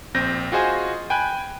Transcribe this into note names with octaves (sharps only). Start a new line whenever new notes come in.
A#1 C4 G6 A#6
F4 F#4 G#4 C5 D#5 G#5
G5 G#5 B5 F#6